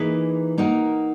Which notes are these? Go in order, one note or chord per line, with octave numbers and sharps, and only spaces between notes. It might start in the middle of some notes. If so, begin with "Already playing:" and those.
Already playing: E3 A#3 D#4 G#4 B4
A#3 D#4 F#4 A#4